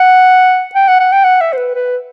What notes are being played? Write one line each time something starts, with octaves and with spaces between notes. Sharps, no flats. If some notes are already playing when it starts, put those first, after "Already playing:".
Already playing: F#5
G5
F#5
F#5
G5
F#5
E5
C5
B4
B4